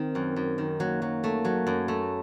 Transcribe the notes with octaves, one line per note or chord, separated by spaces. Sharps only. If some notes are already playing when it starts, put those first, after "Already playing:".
Already playing: D#3 C4
F#2
F#2
D#3
F#3 A#3
F#3
A3
F#3
F#2
A3